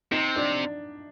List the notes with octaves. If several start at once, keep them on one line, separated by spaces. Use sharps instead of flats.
C3 D#4
D4